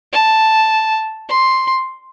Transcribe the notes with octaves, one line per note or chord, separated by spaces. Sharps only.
A5
C6